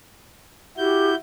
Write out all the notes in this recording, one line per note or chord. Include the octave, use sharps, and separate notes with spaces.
E4 F#4 G4 G6